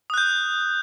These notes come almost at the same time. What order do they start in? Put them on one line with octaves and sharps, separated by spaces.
D#6 F#6 G6